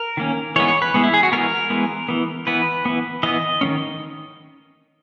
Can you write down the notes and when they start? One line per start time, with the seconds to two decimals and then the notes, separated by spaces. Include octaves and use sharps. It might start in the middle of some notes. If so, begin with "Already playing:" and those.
Already playing: A#4
0.17 D#3 A#3 C#4
0.56 E3 G#3 B3 C#5
0.68 C#5
0.82 B4
0.94 E3 G#3 B3
1.04 E4
1.14 G#4
1.23 F#4
1.32 E3 G#3 B3 A#4
1.70 E3 G#3 B3
2.09 E3 B3
2.47 E3 B3 B4
2.85 E3 B3
3.23 E3 B3 D#5
3.61 D#3 A#3 C#4